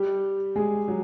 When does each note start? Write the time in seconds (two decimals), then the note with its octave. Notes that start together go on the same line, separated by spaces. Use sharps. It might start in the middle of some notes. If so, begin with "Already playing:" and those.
Already playing: G3 G4
0.56 G#3 G#4
0.88 F#3